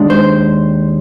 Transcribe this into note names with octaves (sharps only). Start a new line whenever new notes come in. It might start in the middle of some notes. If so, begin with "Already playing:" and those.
Already playing: D#2 D#3 G#3 D4
C5